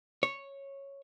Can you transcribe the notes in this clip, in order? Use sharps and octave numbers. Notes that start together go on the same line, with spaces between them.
C#5